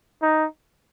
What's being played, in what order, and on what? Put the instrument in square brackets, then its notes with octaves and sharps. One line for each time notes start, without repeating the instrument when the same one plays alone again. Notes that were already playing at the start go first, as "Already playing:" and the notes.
[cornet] D#4